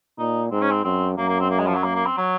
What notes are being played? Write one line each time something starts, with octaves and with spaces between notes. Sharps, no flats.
A#2 D#4
G#2 C4
C#4
C4
F#2 C4
F#2 A#3
A#3
C4
A#3
G#3
F3
F#3
A#3
A#3
C4
F#3